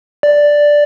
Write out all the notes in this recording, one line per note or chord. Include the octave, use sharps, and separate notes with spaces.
D5